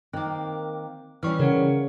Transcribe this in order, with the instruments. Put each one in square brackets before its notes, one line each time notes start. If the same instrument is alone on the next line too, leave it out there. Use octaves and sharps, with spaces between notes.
[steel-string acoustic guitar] D#3 A#3 [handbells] C4 D6
[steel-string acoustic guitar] E3 G3 C#4 [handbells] C#6 F6
[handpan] C#3 [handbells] A#4 C#5 F#5